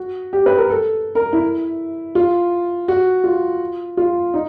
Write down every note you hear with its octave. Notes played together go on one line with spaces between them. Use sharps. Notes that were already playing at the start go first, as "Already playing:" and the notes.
Already playing: F#4
G4
B4
A#4
A4
A#4
E4
F4
F#4
F4
F4
D#4